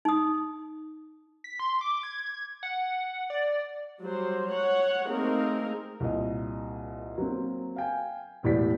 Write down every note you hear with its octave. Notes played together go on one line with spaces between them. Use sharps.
D#4 D#6
B6
C6
D6
G#6
F#5
D5
F#3 G3 C5
C#5 F#5
A3 A#3 C4 D#4 G#4 A#4
C2 A#2 D#5
F#3 A#3 C4
F5 G5 G#5
E1 E2 A2 G4 D5 B6